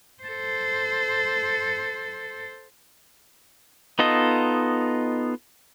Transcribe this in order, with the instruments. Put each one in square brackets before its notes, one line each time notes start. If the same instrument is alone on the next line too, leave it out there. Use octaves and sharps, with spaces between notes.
[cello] A4 C5
[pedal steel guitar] B3 D#4 F4 A4 D#5